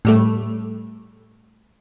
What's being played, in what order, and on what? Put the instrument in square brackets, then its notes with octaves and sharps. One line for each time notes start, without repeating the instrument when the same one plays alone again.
[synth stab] A2 G3 A3